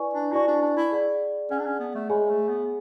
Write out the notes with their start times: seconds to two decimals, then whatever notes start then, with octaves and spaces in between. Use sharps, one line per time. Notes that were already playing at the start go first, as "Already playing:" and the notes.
Already playing: E4 B4 D5 G#5 C#6
0.14 D4
0.33 E4 F#4 B4 D5 G#5 C#6
0.48 D4
0.62 D4
0.77 E4
0.92 G#4 D5 F#5
1.50 C#4 G#4 D5 F#5
1.59 D4
1.66 C#4
1.80 B3
1.95 A3
2.09 G#3 G#4 C#5 E5 G#5 B5
2.30 A3
2.49 B3